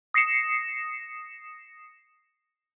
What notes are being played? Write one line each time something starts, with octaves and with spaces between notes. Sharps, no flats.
D#6 A#6 C7 C#7 E7